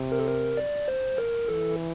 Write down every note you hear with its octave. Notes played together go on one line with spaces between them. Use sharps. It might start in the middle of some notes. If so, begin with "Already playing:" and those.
Already playing: C3
A#4
A4
A#4
D5
C5
A#4
E3 A4